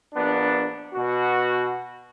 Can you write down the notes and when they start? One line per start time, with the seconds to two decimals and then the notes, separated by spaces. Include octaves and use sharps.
0.15 A#1 B3 D4
0.95 B2 F#4